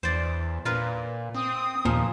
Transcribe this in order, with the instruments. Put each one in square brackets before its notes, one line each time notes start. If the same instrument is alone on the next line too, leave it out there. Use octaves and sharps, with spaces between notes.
[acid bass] E2 [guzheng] C5 D5
[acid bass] A#2 [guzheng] F4 A#4 B4
[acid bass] C4 [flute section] D#6
[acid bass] D#2 [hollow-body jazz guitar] A#2 [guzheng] F3